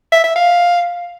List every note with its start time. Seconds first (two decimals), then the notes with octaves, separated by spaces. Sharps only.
0.12 E5
0.24 E5
0.36 F5